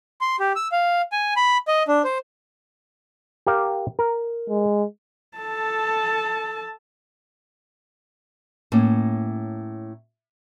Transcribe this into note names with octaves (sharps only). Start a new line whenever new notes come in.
C6
G4
E6
F5
G#5
B5
D#5
D4
C5
G4 A#4 F5
A#4
G#3
A4 A5
A2 A#3 C#4